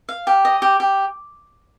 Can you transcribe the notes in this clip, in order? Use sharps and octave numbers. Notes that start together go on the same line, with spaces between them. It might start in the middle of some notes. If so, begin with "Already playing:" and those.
F5
G4
D#5
G4
G4